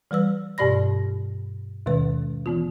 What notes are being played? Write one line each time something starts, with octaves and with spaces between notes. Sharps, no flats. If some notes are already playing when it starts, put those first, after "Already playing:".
E3 G3 B4 E6
G2 B2 G4 D5 B5 A#6
D#2 B2 D#3 G#3 B4
E3 B3 F4